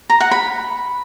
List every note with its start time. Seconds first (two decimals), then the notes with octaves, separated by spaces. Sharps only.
0.10 A#5
0.20 F#5
0.31 B5